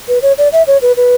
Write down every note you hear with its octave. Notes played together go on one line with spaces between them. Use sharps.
B4
C#5
D5
E5
C#5
B4
B4